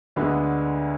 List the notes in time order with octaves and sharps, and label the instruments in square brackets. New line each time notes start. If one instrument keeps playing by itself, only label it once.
[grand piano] D2 D3 G#3 B3 D4